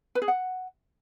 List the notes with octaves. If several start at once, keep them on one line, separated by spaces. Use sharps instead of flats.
B4
G#4
F#5